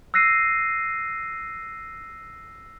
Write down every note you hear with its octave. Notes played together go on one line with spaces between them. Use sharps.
E6 F#6 A#6 C7 D#7